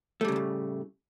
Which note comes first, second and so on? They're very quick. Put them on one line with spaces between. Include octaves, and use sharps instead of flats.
A3 G3 C#3 E2 A2